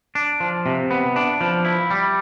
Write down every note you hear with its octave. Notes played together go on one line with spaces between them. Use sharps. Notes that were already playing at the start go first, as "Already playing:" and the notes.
D4
F3
C3
B3
D4
F3
E4
G3